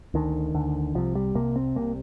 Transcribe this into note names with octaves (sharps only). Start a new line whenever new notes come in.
D2 D3 D#3
D2 D3
C2 C3 F3
G3
C2 C3 A#3
C4
C2 C3 A#3